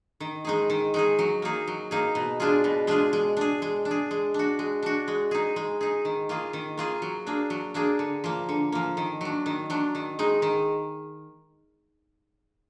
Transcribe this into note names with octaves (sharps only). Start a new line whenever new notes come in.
D#3
G#3 D#4 G#4
D#3
G#3 D#4 G#4
F#3
A#3 D#4 G#4
F#3
A#3 D#4 G#4
B2
G#3 D4 F4 G#4
B2
G#3 D4 F4 G#4
G#3
D4 G#4
G#3
D4
G#4
G#3
D4 F#4
G#3
D4 F#4
G#3
D#4 G#4
G#3
D#4 G#4
D#3
A#3 F4 G#4
D#3
A#3 F4 G#4
F#3
A#3 D4 G#4
F#3
A#3 D4 G#4
D3
F3 A#3
D3
F3 A#3
D#3
F#3 D4
D#3
F#3 D4
D#3
G#3 D#4
D#3